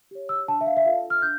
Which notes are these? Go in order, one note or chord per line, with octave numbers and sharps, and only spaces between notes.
G4 C#5
E6
D4 A5
E5
F5
E5
F4 A4 F5
F6
D4 G6